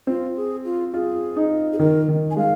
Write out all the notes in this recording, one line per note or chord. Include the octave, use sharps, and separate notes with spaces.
C4 F4
G#4
F4
F4 G#4
D#4
G#4
D#3 A#4
D#3
G#5
G#3 F5